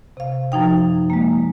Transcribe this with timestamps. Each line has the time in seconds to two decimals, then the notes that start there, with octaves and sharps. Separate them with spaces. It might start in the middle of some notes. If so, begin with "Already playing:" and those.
0.17 C3 F5
0.52 F#2 F3 D#4 G5
1.10 G#3 A#3